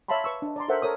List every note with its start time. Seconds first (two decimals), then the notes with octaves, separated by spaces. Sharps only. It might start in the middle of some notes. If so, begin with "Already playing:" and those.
0.08 C#5 E5 F5 A5 B5 C6
0.24 B4 C#6 E6
0.42 D4 D#5
0.56 D5 A#5 C6
0.68 A4 A#4 C5 E5 F#5
0.82 A4 A#4 C#5 D#6